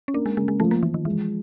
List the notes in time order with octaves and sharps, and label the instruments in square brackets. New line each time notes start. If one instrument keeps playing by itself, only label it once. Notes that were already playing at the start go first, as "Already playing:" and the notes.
[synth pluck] C#4
[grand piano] A#3 [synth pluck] D4
[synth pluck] G#3
[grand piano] C#3 [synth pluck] G#3
[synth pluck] G#3
[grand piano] F3 [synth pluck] A3
[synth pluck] A#3
[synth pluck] E3 [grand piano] F3
[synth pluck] D#3
[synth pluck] E3 [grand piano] G#3